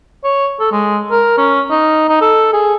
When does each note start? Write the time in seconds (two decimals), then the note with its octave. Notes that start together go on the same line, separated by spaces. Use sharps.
0.24 C#5
0.60 A4
0.72 G#3
1.11 A#4
1.38 C#4
1.71 D#4
2.09 D#4
2.21 A4
2.53 G#4